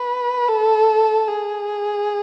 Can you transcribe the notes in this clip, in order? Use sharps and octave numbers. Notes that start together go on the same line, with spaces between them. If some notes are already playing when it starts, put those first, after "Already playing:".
Already playing: B4
A4
G#4